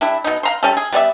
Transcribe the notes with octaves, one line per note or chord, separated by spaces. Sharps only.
G3 D4 E4
B2 D#4
F5 A#5 C6
G3 C#4 A4
G#4
G3 B3 D5 E5